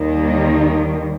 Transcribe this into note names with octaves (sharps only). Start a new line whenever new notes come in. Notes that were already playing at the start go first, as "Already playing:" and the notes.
Already playing: D#2 D#3 G3 A#3